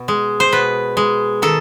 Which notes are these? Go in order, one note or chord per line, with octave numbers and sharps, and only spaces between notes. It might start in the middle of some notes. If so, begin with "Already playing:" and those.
Already playing: B2
G#3
C5
B2 B4
G#3
D#3 A4